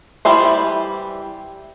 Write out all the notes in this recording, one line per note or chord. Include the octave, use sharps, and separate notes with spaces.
E3 G3 E4 C5